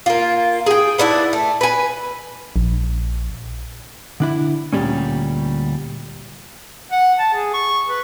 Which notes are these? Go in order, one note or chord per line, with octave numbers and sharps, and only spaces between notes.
A#3 F4
G#4 G5
B3 C#4 D4 E4
A3
B4 G#5
A#1
D3 D4 E4
D2 A#2 E3 G3 G#3 C#4
F#5
A5
G#4
C#6
B4